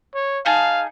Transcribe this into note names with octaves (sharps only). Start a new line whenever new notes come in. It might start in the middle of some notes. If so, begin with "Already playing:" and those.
C#5
D#4 G#4 F5 A5